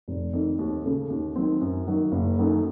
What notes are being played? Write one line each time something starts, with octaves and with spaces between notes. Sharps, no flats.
F1
F2 D#3
D#2
C#3 A3
D#2
D#3 F#3 C4
F#2
D#3 F#3 A#3
F#1
F#2 D#3 F#3 A3